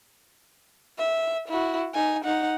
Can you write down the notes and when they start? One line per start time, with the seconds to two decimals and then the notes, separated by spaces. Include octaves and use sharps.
0.98 E5
1.49 E4 F#4
1.94 D#4 G#5
2.24 D#4 F#5